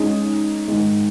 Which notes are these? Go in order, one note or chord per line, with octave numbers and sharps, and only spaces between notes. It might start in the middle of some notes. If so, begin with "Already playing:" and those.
Already playing: G#3 C#4 D#4 G#4
G#2 D#3 G#3